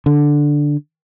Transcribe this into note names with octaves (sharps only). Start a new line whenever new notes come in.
D3